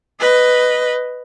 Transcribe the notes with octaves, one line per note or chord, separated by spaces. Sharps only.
B4 D#5